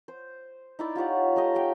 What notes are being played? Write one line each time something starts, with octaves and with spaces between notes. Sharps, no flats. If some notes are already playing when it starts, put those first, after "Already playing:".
C5
D#4 E4 D5
F4 G4 C#5 F#5
A3 D#4 G4 D#5
G4 F5 G5